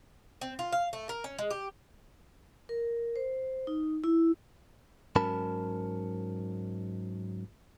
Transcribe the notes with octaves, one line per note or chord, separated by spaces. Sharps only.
C4
F4
F5
A3
A#4
C#4
G#3
G4
A#4
C5
D#4
E4
G#2 F#3 C#4 A#4 A5 B5